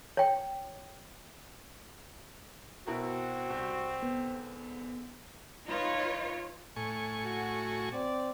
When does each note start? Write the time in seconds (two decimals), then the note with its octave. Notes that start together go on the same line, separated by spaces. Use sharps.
0.17 C#5 G5
2.87 B2 C4 E4 F#4 A#4
3.50 C2
4.03 G#2 D3 B3
5.66 D#4 F4 B4 C#5
6.76 A2 G#5 C#6
7.25 F#4
7.93 C4 D5